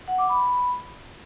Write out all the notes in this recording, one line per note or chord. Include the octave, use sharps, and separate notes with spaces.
F#5
D6
B5